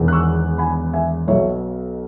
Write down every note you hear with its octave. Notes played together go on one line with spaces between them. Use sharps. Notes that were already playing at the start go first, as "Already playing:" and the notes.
Already playing: E1 E2 D#3
F#6
C#6 E6
G#5 B5
E5 G#5
B1 B2 C#5 E5